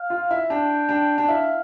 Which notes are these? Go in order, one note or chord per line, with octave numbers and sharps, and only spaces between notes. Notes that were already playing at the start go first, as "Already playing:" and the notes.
Already playing: F5
F4
E4
D4 G5
D4
D4
E4 F5